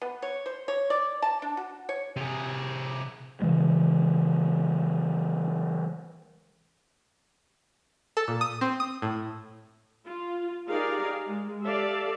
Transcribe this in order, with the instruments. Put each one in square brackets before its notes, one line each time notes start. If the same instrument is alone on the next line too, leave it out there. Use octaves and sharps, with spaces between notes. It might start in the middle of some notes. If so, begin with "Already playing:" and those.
[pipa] B3
C#5
C5
C#5
D5
A5
D4
F#4
C#5
[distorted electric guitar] C3 G#4
[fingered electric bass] C#3 E3 G#3
[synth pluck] A4
A#2
D#6
C4
D#6
A2
[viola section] F4
D#4 G4 G#4 A#4 D5 F5
G#3
G4 A4 D5 E5 F5